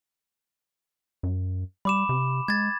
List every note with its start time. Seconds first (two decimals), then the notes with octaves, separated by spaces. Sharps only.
1.23 F#2
1.85 G3 B5 D6 E7
2.09 C3
2.48 G#3 G#6 A6